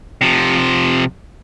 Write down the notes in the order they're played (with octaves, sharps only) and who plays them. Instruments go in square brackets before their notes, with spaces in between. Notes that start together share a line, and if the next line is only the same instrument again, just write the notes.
[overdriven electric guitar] C3 F3